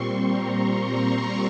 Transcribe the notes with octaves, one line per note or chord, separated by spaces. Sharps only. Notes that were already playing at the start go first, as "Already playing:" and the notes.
Already playing: A#2 G3 C4 C6 C#6
A#5